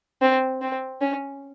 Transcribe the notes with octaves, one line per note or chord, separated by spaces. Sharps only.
C4
C4
C#4